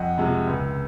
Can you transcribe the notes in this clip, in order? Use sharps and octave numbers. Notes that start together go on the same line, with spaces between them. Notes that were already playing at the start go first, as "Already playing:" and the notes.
Already playing: F2 D#5 F#5
C3 F3 G#3
C#2